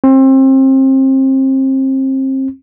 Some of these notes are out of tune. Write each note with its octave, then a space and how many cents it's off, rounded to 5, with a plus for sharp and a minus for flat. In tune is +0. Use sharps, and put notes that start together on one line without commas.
C4 +30